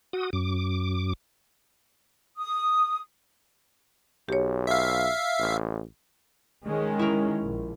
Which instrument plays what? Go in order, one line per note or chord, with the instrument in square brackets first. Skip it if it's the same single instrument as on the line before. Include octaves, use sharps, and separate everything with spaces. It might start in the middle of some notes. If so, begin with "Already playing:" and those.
[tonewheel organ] F#4 D#6
F#2 D6
[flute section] D#6
[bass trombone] B1 [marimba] G4 C#5
[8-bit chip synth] E5 F5
[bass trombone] A1
[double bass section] D#3 G#3 C#4
[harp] E4 A#4
[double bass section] A#1